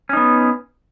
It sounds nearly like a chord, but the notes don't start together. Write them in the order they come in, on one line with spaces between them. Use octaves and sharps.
C#4 D#4 B3